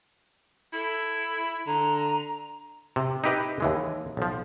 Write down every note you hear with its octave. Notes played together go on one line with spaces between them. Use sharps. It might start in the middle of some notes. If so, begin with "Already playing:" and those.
E4 A4
D3 A#5
C3
D#4 E4 G4 B4 D#5
D#2 E3 G#3
B1 F3